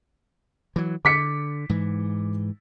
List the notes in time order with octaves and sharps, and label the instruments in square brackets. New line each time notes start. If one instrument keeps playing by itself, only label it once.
[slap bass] E3 F#3
[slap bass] D3 [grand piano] D6 B6 C#7
[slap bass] G#2 E3